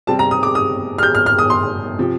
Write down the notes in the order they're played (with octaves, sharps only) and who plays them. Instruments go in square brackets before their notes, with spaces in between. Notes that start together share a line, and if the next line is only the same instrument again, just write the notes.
[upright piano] C3 G3 C4 A5
A#5
D#6
D6
D#6
F6
G6
F6
F6
D#6
C6
C3 F3